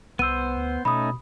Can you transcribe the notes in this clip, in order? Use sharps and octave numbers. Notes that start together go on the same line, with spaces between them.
C2 B3 C5 E6 D#7
D2
B2 A3 C#4 D#4 B5 D#6